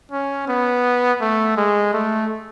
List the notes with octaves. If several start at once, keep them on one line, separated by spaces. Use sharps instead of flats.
C#4
B3
A3
G#3
A3